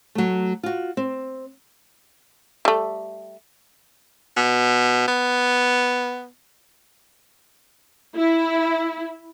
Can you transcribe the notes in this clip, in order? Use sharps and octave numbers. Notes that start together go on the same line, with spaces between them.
F#3 A3
F4 F#4
C4
G3 A3
B2
B3
E4